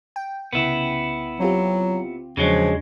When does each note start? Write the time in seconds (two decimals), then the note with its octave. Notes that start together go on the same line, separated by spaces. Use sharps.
0.16 G5
0.53 C2 C#3 B3 E4
1.40 F#3 C4 F4 G4
2.37 E2 C#3 F3 F#3 G#3 D4